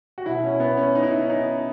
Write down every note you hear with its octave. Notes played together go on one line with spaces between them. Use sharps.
F#4
B2 E4
C#4
B3
C#4
D#4
E4
D#4
C#4
D#4